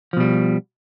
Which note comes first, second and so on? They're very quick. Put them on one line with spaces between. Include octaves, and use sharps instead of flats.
F3 B2 G3